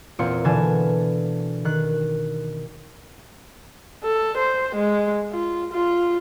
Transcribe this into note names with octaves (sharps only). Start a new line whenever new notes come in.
E2 A#2 A#3 C4 F4 C#7
B2 D3 E3 G#5 A5 E7
D#3 F#6
A4
C5
G#3
F4
F4